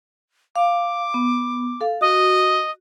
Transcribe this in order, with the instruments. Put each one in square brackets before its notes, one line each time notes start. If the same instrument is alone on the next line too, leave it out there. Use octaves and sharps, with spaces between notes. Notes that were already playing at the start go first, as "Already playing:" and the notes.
[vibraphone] F5 [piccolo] D6
[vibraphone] B3
A4 F5
[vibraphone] F#4 [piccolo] D#5